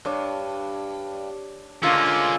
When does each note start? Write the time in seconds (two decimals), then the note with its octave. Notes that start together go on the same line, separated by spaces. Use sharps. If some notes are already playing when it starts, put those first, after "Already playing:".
0.05 G2 D4 C#5
1.83 D3 G#3 A#3 C#4 F4 E6 A6 D#7